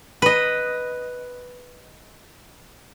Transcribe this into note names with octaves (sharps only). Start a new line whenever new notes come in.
B4 D#5